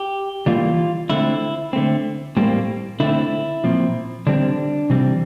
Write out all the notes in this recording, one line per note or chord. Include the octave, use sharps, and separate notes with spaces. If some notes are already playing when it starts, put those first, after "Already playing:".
Already playing: G4
E3 G3 A#3 F4
D3 A3 C4 E4
D3 A3 C4
A2 G3 A#3 C4
D3 A3 C4 E4
A#2 F3 C4
D3 G3 C4 D4
C3 E3 G3 C4